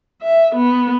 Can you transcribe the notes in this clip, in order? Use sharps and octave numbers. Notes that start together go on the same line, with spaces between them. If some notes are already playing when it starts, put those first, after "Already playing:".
E5
B3